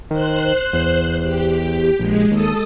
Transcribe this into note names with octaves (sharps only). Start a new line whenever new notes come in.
D#3 C5 F#6
E2
G4
A#1 G#3
D#2 A4 D#6 A6